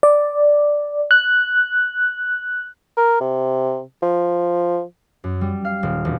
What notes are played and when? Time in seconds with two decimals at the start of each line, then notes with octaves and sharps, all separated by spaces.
0.03 D5
1.11 F#6
2.97 A#4
3.21 C3
4.02 F3
5.24 F#2
5.41 G3
5.65 F5
5.83 D#1
6.05 E1